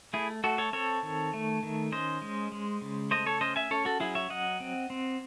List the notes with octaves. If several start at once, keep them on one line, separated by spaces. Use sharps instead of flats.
A3 E4 G#4
A3 F#4 A4
A4 C#5
C4 A4 C#5
D#3
A3
D#3
C#4 C5 D#5
G#3
G#3
C#3
A3 C5 D#5
A4 C#5
C#4 C5 D#5
E5 G#5
C#4 A4 C#5
F#4 A4
F#3 E4 G#4
C#5 E5
F#3 D#5 F#5
C4
C4